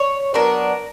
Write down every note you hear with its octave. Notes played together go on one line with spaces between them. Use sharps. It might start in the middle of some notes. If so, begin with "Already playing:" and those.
Already playing: C#5
F#3 B3 D4 A#4